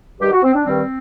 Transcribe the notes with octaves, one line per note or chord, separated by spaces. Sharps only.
G2 D#3 G3 G4
F#4
C4
D4
G2 D#3 G3 C4